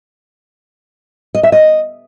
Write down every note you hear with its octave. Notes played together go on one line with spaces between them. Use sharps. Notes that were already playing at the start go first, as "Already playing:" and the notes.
D#5
E5
D#5